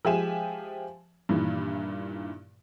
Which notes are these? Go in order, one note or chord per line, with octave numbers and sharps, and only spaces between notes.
F3 G#3 G4 E5 G#5 E7
G2 A#2 D#3 E3